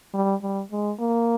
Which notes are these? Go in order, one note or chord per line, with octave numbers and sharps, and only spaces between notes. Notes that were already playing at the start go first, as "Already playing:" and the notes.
G3
G3
G#3
A#3